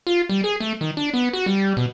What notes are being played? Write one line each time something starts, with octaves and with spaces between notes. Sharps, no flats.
F4
G3
G#4
A3
D#3
D4
B3
F#4
G3
B2